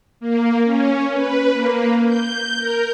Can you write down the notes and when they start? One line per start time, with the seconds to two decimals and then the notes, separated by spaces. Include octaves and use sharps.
0.20 A#3
0.64 C#4
1.12 B4
1.54 A#3
2.06 G6
2.59 A#4